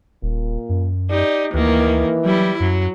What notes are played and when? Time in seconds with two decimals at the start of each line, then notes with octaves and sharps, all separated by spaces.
0.23 D#1 A#2
0.69 F#2
1.10 D#4 G4 D5
1.54 D2 D#3 E3 A#3
2.25 F#3 G3 E4
2.60 F#2 F#3